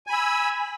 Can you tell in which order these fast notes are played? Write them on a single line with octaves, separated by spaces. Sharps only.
G#5 B5 E6